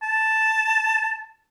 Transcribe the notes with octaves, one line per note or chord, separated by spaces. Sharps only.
A5